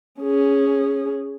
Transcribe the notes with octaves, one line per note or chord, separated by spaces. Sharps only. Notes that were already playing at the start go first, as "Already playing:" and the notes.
C#4 G#4